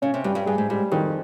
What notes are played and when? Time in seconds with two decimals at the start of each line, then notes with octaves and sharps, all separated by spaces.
0.02 C#3 C#4
0.14 C3
0.24 G2 G3
0.35 G2
0.46 G2 G#4
0.58 G#2
0.69 G#2 G3
0.91 F2 D#3